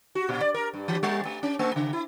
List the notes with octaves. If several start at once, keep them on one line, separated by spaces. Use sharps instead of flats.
F#4
A#2
D5
A#4
G2
E3
G3
A3
C#4
A3
C#3
E4